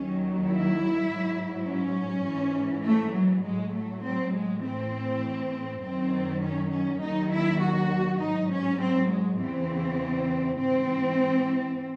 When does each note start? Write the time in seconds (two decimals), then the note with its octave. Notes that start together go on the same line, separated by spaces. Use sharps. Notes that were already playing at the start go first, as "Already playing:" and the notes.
Already playing: D#2 D#3 F#3 C#4
0.45 E4
1.05 G#2 F#3
1.65 C#4
2.25 G#2 E3
2.85 A3
3.14 F#3
3.44 A2 F#3 G#3
3.73 A3
4.04 C4
4.34 G#3
4.63 A2 E3 C4
5.82 F#2 D#3 F#3 C4
6.43 C#4
6.71 C#4
7.02 D#2 D#3 F#3 D#4
7.31 E4
7.61 F#4
8.21 G#2 F#3 D#4
8.51 C#4
8.81 C4
9.11 G#3
9.41 E2 C#3 E3 C4
10.59 G#2 E3 C4